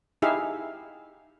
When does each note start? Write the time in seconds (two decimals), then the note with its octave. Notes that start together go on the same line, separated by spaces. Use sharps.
0.22 D#4 E4 G4 G#4 E5 F5